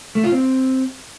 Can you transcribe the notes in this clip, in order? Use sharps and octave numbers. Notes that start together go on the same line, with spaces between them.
A3
F4
C4